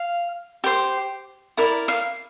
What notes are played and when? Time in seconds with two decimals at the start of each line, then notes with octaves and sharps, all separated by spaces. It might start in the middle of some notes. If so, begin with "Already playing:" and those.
Already playing: F5
0.64 G4 C5
1.57 E4 A#4 D5
1.88 F5